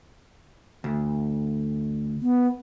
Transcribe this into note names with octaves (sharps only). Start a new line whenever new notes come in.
D2
B3